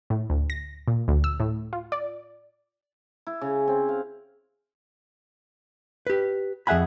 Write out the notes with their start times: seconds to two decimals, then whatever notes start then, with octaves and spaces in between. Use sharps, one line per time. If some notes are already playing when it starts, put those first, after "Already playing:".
0.10 A2
0.30 D2
0.50 A#6
0.88 A#2
1.08 D2
1.24 E6
1.40 A2
1.73 F4
1.92 D5
3.27 E4
3.41 C#3
3.68 C4
3.89 F5
6.07 G4 B4
6.67 F2 G#4 E5 F#5 G#5 B5